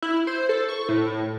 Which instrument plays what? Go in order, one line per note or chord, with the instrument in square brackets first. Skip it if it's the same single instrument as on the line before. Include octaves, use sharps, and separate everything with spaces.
[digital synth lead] E4
C5
A4
C#6
A2